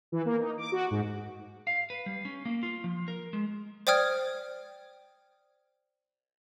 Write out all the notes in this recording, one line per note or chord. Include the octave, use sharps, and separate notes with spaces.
E3
A#3
D#4
D6
F#4
G#2
F5
B4
G3
C#4
A#3
F4
F3
A#4
G#3
C5 D5 G5 D#6 F6 G#6